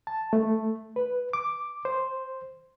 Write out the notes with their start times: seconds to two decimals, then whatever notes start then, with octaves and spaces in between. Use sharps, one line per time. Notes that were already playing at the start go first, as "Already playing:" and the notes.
0.07 A5
0.33 A3
0.96 B4
1.33 D6
1.85 C5